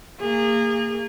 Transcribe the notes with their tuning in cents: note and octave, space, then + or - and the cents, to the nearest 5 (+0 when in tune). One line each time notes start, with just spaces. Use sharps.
A#3 -30 G#4 -30